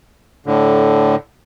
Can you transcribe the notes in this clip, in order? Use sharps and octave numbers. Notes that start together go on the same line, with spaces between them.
A2 D3